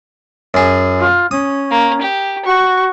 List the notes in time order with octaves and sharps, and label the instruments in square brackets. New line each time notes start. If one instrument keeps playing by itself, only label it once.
[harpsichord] F#2 G#4
[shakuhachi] F4
[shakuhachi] C#4 [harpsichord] D#6
[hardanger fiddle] A#3
G4
[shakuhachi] F#4 [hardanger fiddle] C#6